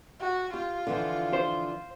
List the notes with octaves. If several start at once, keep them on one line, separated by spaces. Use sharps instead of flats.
F#4
F4 G4
D3 E3 F3
C5